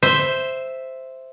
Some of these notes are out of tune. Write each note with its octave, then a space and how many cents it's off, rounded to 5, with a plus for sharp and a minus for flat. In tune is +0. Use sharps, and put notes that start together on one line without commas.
C5 +0 E5 +0